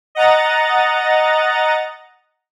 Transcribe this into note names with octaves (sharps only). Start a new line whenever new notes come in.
D#5 F#5 A#5 A6